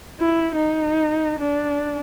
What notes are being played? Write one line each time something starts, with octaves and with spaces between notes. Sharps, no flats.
E4
D#4
D4